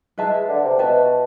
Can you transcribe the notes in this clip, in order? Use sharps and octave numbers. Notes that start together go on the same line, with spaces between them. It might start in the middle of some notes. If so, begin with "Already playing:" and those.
G#3 B4 E5 A5
D3
C3
B2 B4 E5 A5